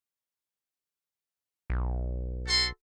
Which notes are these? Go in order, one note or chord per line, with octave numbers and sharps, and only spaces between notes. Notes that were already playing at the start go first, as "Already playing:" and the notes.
B1
F#4 A4 C6